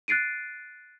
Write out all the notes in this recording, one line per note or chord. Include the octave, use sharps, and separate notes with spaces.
F#6 A6 C7 D7 D#7